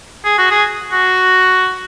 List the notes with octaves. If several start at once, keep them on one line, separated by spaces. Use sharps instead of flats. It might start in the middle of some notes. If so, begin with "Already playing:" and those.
G#4
F#4
G#4
F#4